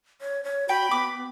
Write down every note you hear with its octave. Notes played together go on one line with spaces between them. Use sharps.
C#5
C#5
F#4 G5 B5
B3 D6